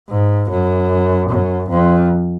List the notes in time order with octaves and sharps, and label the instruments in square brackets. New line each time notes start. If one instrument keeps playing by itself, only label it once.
[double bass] G#2
F#2
F#2
F2